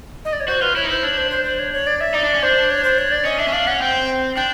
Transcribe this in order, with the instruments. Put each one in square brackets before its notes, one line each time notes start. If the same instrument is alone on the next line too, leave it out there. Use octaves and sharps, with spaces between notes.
[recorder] D#5
D5
C#5
[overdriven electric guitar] F#4 [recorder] C5
[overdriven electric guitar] F4 [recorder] B4
[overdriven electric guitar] E4 [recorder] C#5
[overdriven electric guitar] D#4
[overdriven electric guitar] E4 [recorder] C5
[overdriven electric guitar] D4 [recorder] C#5
[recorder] C5
C5
C5
C#5
C#5
D5
E5
[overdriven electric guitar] D#4 [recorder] D5
[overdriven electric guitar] D4
C#4
[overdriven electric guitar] D4 [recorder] C5
[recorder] C#5
C5
C#5
D5
[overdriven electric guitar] C#4 [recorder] D#5
[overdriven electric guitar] D4 [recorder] E5
[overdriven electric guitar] C#4
[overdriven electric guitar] D4 [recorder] F5
[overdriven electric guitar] C#4 [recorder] F#5
[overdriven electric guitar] C4 [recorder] G5
[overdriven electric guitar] D4 [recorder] G5